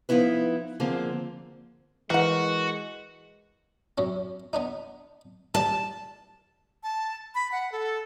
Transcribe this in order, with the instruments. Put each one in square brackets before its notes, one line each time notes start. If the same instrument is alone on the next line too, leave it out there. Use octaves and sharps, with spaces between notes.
[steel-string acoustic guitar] F3 B3 D#4 E4 B4
D3 F3 A#3 C4 G#4
[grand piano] E3 [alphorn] G#3 [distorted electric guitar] F#4 [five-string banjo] A#4 F#5
[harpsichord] F#2 C3 C#4
B3 D4 D#4
[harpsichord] D#3 G3 G4 [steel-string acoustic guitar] A5
[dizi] A5
B5
F#5
A4